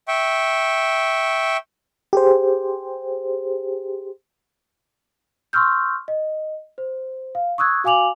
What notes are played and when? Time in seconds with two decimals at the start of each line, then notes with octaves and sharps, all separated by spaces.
0.08 E5 G5 C#6
2.13 G4 G#4 C5
5.53 C6 C#6 E6 F6 G6
6.08 D#5
6.78 C5
7.35 F5
7.58 C#6 D#6 E6 F#6 G#6
7.84 F#4 F5 G#5 D6 F7 F#7